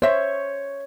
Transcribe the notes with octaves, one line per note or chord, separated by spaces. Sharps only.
C5 C#5 E5